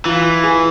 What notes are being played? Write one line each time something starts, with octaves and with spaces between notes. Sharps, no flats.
E3 F4
G#4